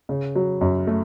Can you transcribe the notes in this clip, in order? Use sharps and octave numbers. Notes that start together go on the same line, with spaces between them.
C#3
F#3
F#2
A3